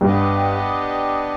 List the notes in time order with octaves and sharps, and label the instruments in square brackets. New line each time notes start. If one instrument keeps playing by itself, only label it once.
[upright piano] G2 [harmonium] B3 D4 G4 B4 D#5